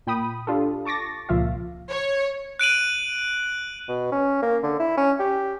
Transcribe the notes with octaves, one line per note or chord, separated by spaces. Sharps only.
A#2 G5 B5 D#6
D4 F4 G4 A4
A5 C#6 D6 A6 A#6
C#2 A#2 F3 F4 E5 F5
C#5
F#6 D7 D#7 F#7
B2
C#4
A#3
D3
E4
C#4
G4